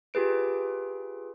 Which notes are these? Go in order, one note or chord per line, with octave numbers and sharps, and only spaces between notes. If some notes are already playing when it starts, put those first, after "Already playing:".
F4 G4 G#4 B4 D7